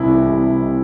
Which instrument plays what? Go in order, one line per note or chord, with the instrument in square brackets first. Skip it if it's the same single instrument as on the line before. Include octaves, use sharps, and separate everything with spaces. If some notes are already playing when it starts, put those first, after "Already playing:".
Already playing: [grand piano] C2 C3 E4
E3
C2
C2
C3